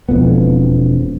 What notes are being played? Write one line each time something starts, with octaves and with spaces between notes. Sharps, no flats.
E1 F2 B3